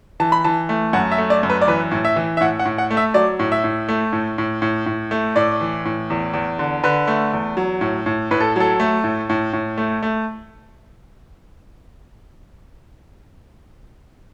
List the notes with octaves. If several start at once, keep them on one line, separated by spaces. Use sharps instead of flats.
E3 A5
B5
E3 A5
A3
F#2 F#5
E5
A3
D5
F#2
B4
D5
E3 B4
A2
E5
E3
E5
A2 F#5
F#5
A2
F#5
A3
E5
F#3 D5
A2
E5
A2
A3
A2
A2
A2
A2
A3
A2 D5
E3
A2
E2
E2
D3
D3 B4
A3
E2
F#3
A2
A2
A2 B4
A4
F#3 A4
A3
A2
A2
A2
A3
A3